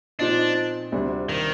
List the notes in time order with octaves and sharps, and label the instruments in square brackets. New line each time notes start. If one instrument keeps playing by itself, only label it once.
[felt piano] A#2 F3 C4 D#4 [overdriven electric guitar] D4
[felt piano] D2 C3 G3 D4
[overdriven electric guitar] D#3